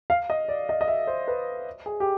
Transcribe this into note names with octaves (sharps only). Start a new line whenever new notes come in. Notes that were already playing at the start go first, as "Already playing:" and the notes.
F5
D#5
D5
D#5
D#5
E5
C5
B4
G#4
G4